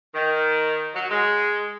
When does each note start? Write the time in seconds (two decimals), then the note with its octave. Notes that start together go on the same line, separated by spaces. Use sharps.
0.13 D#3
0.94 F#3
1.10 G#3